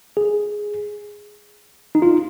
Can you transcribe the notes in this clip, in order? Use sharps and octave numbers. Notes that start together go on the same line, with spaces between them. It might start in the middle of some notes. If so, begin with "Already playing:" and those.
G#4
D#4
F4